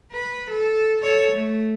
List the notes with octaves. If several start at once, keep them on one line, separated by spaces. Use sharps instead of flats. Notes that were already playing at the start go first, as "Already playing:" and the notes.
B4
A4
A4 C#5
A3